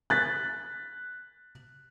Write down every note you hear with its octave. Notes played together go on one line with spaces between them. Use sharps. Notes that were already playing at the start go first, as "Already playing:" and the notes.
F#6 A6 B6